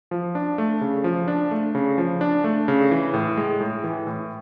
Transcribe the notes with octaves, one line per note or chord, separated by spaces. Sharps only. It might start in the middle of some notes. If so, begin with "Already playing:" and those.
F3
D4
A3
C#3
F3
D4
A3
C#3
F3
D4
A3
C#3
E3
A2
G#3
A2
E3
A2